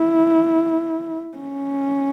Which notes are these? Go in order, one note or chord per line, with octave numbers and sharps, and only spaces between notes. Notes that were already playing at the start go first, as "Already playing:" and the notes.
Already playing: E4
C#4